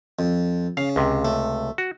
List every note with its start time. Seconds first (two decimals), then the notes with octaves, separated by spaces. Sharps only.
0.19 F2
0.77 C#3 F5
0.96 C#2 C3
1.25 A3
1.78 F#4